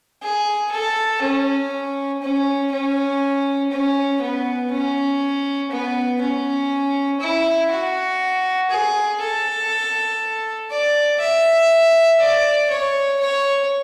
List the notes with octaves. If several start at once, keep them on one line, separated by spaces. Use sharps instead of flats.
G#4
A4
C#4
C#4
C#4
C#4
B3
C#4
B3
C#4
E4
F#4
G#4
A4
D5
E5
D5
C#5
C#5